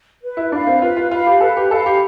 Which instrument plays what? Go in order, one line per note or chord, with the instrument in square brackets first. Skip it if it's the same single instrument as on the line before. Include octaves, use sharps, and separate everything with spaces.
[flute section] B4
[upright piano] E4
[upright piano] D4 [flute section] F5 B5
[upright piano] C4
[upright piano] F4 [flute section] B4
[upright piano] F4
[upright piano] F4 [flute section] F5 B5
[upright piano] G4
[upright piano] A4 [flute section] B4
[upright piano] G4
[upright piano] A4 [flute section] F5 B5
[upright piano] G4